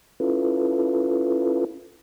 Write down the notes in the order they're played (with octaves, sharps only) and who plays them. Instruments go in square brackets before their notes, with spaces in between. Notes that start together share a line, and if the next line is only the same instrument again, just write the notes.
[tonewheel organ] C#4 E4 F4 A4 B4